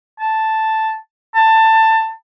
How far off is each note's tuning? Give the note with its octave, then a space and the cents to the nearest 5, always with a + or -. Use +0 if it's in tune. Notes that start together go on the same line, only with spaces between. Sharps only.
A5 +0
A5 +20